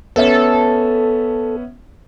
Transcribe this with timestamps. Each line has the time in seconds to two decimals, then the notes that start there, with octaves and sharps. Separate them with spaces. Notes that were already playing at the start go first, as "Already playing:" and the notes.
0.16 B3 C#4 A4 E5